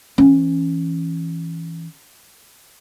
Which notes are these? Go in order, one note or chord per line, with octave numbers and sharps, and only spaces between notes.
E3 C#4